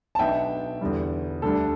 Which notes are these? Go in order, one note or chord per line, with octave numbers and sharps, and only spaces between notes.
A5
B1 B2 B3 D4 E5 G5
E2 D3 G3
D2 D3 G3 D4 A4